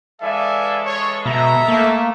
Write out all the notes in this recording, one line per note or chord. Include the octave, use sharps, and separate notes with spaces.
E3 G#3 A4 D5 E5 F5 G#5
C#5
B2 E5 A#5
A3 A#3